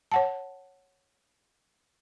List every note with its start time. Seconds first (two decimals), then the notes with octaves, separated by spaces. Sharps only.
0.12 C#5 F#5 A5